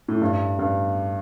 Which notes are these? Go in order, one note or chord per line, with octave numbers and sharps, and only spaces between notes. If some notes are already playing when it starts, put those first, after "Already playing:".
A2
G2
G2